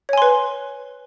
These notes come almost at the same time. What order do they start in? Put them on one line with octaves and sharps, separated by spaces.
C#5 G#5 C6 B4